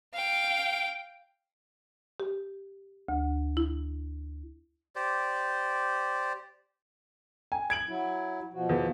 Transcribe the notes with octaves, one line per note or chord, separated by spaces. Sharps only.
F5 G5
G4
D2
E4
G4 C5 D5
G#5
G#6 D7 F#7
F#3 E4
B2 F3 F#4
E2